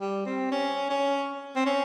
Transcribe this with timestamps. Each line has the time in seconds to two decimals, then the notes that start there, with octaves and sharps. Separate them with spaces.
0.01 G3
0.26 C4
0.52 C#4
0.90 C#4
1.56 C4
1.66 C#4